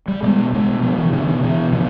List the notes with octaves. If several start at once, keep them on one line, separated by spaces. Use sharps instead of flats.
G3
B2 G#3
B2 G#3
B2 F3
E3
B2 D3
D#3
B2 E3
B2 F3